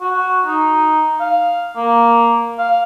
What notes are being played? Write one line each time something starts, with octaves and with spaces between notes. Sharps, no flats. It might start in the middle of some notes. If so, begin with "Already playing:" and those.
F#4
D#4
F5
A#3
F5